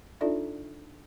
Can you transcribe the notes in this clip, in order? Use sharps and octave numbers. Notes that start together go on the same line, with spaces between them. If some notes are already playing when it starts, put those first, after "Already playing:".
D4 D#4 F4 A4 D5 E5